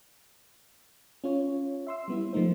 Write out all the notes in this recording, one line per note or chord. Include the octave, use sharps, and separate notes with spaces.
C#4 F4 C#5
E5 C6 E6
G3 B3 E4
F3 A3 A#3 D#4 C5